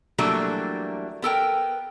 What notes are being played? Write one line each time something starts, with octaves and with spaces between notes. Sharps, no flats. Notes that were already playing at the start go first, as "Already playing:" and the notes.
E3 F#3 G3 A3 A#3 D4
B3 A4 A#4 G5